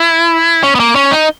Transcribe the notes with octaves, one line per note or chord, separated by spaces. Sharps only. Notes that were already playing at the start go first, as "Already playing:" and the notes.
Already playing: E4
C#4
B3
A#3
C#4
D#4